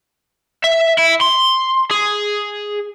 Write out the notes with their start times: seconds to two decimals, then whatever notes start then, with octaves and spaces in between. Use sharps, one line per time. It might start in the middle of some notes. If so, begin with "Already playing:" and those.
0.64 E5
0.98 E4
1.21 C6
1.91 G#4